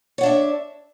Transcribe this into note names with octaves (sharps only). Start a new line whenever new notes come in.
D4 C#5 E5 F#5